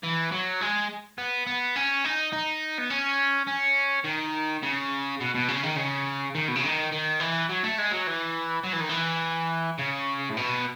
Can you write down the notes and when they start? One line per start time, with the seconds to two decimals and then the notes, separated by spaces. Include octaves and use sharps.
0.03 E3
0.32 F#3
0.61 G#3
1.18 B3
1.47 B3
1.76 C#4
2.05 D#4
2.33 D#4
2.78 B3
2.90 C#4
3.47 C#4
4.04 D#3
4.63 C#3
5.20 B2
5.35 B2
5.48 C#3
5.63 D#3
5.77 C#3
6.35 D#3
6.48 B2
6.56 C#3
6.63 D#3
6.92 D#3
7.20 E3
7.49 F#3
7.64 A3
7.78 G#3
7.92 F#3
8.07 E3
8.64 F#3
8.73 E3
8.80 D#3
8.89 E3
9.79 C#3
10.30 A2
10.37 B2